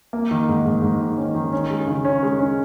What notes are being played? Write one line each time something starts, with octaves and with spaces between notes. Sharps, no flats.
A#3
D#3
G#2
G#2
G#2
D#3
C#4
D#3
C#4
G#3
C#3
C#4
G#3
C#4